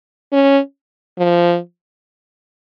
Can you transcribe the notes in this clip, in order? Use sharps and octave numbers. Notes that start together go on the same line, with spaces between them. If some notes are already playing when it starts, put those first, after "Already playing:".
C#4
F3